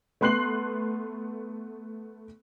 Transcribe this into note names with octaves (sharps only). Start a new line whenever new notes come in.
A3 B3 C6 F#6 C7 F#7